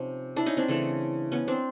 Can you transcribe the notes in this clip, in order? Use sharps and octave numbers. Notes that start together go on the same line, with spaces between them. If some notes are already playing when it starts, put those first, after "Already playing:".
Already playing: C3 F3 C#4 D#4
D4 E4
C#4 D#4
C4 D4
C#3 E3 A3
B3 C#4
C4 D4